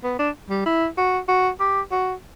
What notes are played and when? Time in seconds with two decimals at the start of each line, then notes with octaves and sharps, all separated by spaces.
0.04 B3
0.19 D4
0.50 G3
0.66 E4
0.98 F#4
1.28 F#4
1.60 G4
1.92 F#4